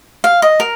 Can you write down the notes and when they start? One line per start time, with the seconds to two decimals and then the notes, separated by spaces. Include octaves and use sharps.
0.24 F5
0.42 D#5
0.60 A#4